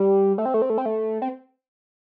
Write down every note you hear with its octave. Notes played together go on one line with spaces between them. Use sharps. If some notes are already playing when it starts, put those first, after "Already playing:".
Already playing: G3
A3
C4
A3
C4
A3
C4
A3
C4